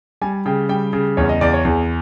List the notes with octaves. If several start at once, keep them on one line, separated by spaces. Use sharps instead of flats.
G3 G#5
C#3 G5
G3 G5
C#3
E2 C#5
D#5
E2 D5
C#5
E2 G#4